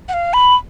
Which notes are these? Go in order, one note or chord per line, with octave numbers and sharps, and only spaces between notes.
F#5
F5
B5